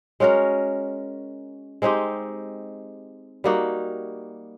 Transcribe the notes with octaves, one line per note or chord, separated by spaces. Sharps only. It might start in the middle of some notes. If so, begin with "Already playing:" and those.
G#3 C#4 F#4 A#4
G#3 C4 D#4 G4
G3 A#3 D#4 F#4